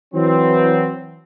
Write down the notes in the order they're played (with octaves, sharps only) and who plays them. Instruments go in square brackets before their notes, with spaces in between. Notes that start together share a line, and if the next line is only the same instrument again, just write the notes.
[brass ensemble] E3 F#3 C4